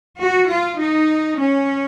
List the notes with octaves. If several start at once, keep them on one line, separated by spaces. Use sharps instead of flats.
F#4
F4
D#4
C#4